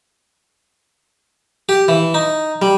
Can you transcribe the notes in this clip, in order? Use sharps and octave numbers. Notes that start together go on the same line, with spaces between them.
G4
E3
D#4
G3